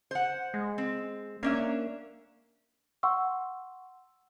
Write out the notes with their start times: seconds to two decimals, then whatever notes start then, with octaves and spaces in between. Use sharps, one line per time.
0.11 C5 F#5
0.54 G#3
0.78 C4
1.43 A#3 C#4 D4 E5
3.03 F#5 C6 C#6 E6